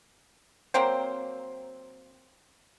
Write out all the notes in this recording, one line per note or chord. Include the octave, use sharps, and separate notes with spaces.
F#3 A#3 C4 C5